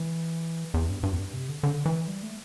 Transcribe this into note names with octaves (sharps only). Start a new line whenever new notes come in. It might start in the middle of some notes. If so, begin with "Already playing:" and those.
Already playing: E3
E2
G2
G2
E2
G2
C3
D3
D3
E3
G3
A3